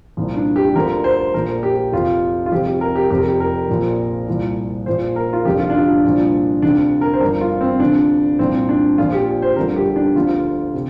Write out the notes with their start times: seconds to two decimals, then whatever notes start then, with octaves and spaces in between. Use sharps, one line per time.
0.17 C2 A#2 F3
0.36 D4
0.56 G4
0.75 D2 D3 F3 A#4
1.04 C5
1.34 A#1 A#2 F3 A#4
1.63 G4
1.92 F1 F2 C3 F3 F4
2.46 F4
2.52 F1 F2 C3 F3 G4
2.66 G4
2.81 A#4
2.96 G4
3.10 F1 F2 C3 G4
3.18 A#4
3.28 G4
3.40 A#4
3.69 A#1 A#2 F3
4.27 C2 A#2 F3
4.86 A#1 A#2 F3 C5
5.16 A#4
5.33 F4
5.45 F1 F2 D3 F3 G4
5.59 F4
5.70 D4
5.74 F4
5.90 D4
6.04 C2 A#2 F3
6.62 D2 C3 F3 D4
7.01 A#4
7.13 C5
7.21 G1 G2 F3 A#4
7.41 F4
7.61 C4
7.80 D2 C3 F3 D4
8.39 C2 A#2 F3 C4
8.69 D4
8.98 A#1 A#2 F3 F4
9.12 G4
9.42 C5
9.56 G1 G2 D3 F3 A#4
9.76 G4
9.96 D4
10.16 D2 D3 F3 F4
10.74 C3